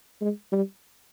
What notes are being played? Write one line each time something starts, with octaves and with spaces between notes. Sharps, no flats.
G#3
G3